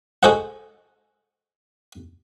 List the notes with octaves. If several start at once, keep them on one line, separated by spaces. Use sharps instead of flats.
F#4 G#4 A4 C5 D#5 F#5